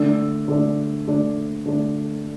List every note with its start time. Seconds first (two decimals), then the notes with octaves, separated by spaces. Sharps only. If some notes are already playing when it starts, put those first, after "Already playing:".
Already playing: D3 A3 D4 E6
0.48 D3 A3 D4
1.07 D3 A3 D4
1.66 D3 A3 D4